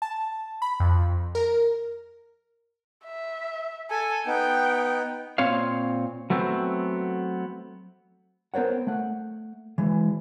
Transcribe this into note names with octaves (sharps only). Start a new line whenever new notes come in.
A5
B5
F2
A#4
E5
A4 G#5
B3 D#4 G5
A#2 C4 C#5 F5
F#3 A3 B3 C4
B3 A#4 C5 C#5 F#5
A3 F#5
E3 G#3